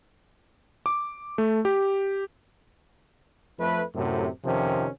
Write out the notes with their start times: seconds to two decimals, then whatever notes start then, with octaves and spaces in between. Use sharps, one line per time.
0.86 D6
1.38 A3
1.65 G4
3.59 F2 A3 B4
3.95 F#2 A2 C3
4.45 F2 C3 D#3 F3 C4 C#4